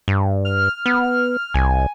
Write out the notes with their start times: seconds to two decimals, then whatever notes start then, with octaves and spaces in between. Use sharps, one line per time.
0.08 G2
0.45 F6
0.86 B3
1.54 C2 G#5